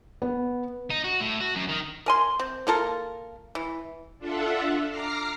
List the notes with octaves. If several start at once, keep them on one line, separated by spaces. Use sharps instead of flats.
B3
D#4
F#4
A2
F#4
F#2
D#3
A#4 G#5 C6
C4
A#3 F4 A4 A#4
E3
D4 F4 A4 E5 F#5
A#5 D6 F6 A#6 C7